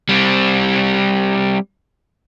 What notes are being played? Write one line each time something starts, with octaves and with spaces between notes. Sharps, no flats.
G3 C4